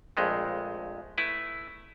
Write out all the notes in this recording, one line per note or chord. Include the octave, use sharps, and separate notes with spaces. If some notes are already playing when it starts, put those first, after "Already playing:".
A#1 F2 G#3 A3
A3 E4 B4